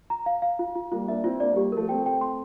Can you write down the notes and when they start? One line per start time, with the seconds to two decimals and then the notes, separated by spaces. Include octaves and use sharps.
0.10 A#5
0.26 F5
0.42 F5
0.59 F4
0.76 F4
0.91 G3 A#3 F4
1.07 A#3 D4 E5
1.24 C4 E4 F4
1.40 A#3 D4 D5
1.52 G3 A#3 G4
1.72 F3 A3 A#4
1.89 A3 C4 G5
2.06 G5
2.21 C6